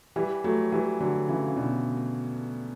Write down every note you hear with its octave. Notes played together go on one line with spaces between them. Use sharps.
E3 G3
F#3 A3
E3 G3
D3 F#3
C#3 E3
C#3
B2 D3